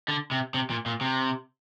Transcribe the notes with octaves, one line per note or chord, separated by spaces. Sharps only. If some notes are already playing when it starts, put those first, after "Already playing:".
D3
C3
C3
A#2
A#2
C3